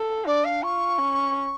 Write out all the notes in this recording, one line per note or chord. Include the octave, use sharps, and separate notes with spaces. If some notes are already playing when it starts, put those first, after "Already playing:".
Already playing: A4
D4 D5
F5
F4 C#6
C#4